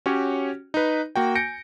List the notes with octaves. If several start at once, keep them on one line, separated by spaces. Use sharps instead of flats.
C#4 F#4 G4 C#5
D#4 B4
A#3 F#4 G5
G#5 G6 A#6 C#7 D7